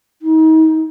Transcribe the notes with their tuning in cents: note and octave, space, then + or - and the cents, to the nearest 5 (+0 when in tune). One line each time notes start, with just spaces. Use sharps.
D#4 +35